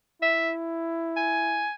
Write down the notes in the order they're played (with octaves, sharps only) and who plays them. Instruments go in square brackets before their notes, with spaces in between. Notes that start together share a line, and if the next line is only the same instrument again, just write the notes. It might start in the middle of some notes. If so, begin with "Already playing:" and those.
[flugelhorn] E4 [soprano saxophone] E5
[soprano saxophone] G#5